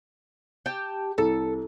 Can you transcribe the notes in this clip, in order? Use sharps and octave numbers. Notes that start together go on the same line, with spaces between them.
G4 G5 A5
C2 A4